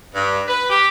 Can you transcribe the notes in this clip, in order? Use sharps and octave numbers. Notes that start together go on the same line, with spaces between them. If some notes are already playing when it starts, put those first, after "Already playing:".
G2
B4
G4